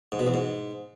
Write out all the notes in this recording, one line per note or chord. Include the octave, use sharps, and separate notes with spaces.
G#2
B2
E2
G#2